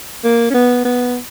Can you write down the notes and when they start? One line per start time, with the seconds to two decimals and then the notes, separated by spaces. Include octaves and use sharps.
0.24 A#3
0.50 C#4
0.54 B3
0.85 B3